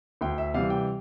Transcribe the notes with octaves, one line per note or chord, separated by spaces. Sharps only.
D2 G5
E5
C3 E3 G3 F5
G5